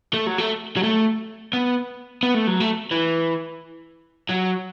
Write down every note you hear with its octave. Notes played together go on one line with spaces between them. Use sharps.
A3
F#3
A3
F#3
A3
B3
B3
A3
F#3
A3
E3
F#3